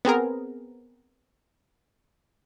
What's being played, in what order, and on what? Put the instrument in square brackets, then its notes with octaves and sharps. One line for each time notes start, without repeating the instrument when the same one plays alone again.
[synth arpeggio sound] B3 C4 G#4 A#4